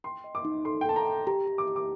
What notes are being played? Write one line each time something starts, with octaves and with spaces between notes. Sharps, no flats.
G5 C6
D#5
D6
D#4
A4 C6
G5
A4 A5
A#5
G5
G4 A#5
G4
D6
G4
D6